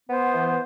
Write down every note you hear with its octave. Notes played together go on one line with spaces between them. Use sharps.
B3 C5
E3